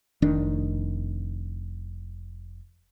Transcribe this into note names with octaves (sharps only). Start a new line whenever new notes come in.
F1 D#3 D4